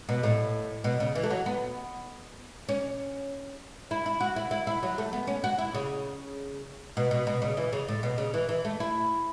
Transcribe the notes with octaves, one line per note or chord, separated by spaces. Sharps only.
B2
A2
B2
C#3
E3
A3
F#3
B3
C#4
E4
E4
F#4
E4
E4
E4
F#3
A3
B3
C#4
F#4
E4
C#3
B2
B2
B2
C#3
E3
C#3
A2
B2
C#3
E3
E3
A3
E4